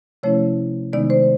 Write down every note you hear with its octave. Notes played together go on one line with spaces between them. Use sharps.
C3 F3 A3 C#4 E4 C#5
C3 D#3 G#3 B3 D#4 D5
C5